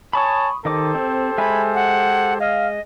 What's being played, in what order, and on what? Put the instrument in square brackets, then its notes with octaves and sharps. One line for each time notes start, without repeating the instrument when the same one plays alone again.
[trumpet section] C#5 G#5 A5 [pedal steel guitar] B5 C#6 D#6
[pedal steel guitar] D#3 D#5 D6 [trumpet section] G4 A4 C5
[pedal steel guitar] C4
[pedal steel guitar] G#3 E5 G#5 [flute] B5
[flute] F#5
[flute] D#5 [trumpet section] F5